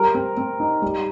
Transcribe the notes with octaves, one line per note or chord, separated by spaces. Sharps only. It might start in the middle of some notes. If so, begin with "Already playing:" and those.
Already playing: G3 A#4
C4
C4
D#4
G3